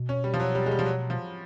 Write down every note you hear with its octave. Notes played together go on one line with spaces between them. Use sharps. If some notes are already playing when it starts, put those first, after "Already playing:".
Already playing: B2
C#4
G3
F3
F#3
G3
G#3
G3
F3
F#3
F3